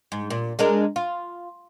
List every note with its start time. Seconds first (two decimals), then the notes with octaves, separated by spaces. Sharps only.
0.12 G#2
0.30 A#2
0.59 G#3 D4 A#4
0.96 F4